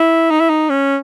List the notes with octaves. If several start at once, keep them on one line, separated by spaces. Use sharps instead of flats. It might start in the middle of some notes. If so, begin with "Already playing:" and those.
Already playing: E4
D#4
E4
D#4
C#4